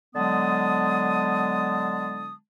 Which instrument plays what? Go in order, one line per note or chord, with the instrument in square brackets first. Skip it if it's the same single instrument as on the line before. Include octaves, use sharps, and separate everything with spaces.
[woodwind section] D3 F#3 G#3 B3 A5 D#6